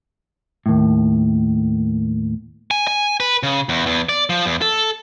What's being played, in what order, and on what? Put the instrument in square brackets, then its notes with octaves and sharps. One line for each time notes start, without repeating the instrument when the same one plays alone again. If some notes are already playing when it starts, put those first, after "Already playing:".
[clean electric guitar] D#2 A2
[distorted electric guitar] G#5
G#5
B4
C#3
E2
E2
D5
F3
E2
A4